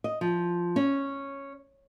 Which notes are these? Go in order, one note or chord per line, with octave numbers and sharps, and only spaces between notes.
D#5
F3
C#4